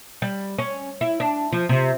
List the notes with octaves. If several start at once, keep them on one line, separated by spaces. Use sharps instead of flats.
G3
C#4
E4
D4
F3
C3